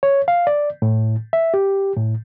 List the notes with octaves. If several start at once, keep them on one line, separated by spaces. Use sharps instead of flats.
C#5
F5
D5
A2
E5
G4
A2